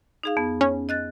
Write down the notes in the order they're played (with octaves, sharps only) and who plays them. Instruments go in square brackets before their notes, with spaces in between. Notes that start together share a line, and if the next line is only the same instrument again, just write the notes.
[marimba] D#4 G#4 F5
F2 B3
[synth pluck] C#4
[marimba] D#5 F#6 A6